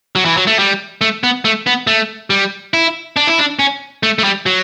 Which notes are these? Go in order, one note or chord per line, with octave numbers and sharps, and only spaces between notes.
F#3
E3
F#3
A3
G3
A3
B3
A3
B3
A3
G3
E4
D4
E4
D4
C#4
A3
A3
G3
F#3